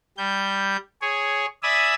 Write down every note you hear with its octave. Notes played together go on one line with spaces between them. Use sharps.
G3 G6
G#4 C#5
D5 E5 G#5 B5 D#6 E6